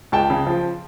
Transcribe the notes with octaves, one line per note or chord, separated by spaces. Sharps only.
C#2 G5 A5
C#3
F3